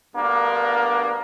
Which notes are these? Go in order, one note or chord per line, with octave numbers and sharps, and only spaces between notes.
D2 G2 A#3 B3 D4 A#4